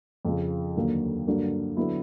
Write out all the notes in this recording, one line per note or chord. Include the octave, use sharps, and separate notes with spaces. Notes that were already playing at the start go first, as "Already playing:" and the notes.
F2 C#3 F3
D#2 D3 F#3 A#3
G2 D3 F#3 A#3
D3 F#3 B3 E4